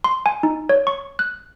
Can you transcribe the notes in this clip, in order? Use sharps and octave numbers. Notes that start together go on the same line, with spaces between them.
C6
G#5
D#4
C#5
C#6
F#6